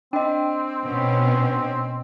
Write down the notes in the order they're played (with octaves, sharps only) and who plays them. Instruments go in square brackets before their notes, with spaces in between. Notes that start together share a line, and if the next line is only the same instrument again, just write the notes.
[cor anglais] C4 [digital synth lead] D4 [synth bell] D#5 G5
[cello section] B2 B3 C#4